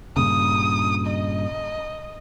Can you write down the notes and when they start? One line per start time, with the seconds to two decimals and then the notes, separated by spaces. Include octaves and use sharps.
0.16 G2 A#2 C#3 D#6
1.07 D#5